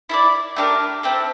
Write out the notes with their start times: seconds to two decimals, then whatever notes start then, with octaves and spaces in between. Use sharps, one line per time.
0.09 E4 A4 D5
0.56 A3 D4 G4 A#4
1.03 C4 E4 A4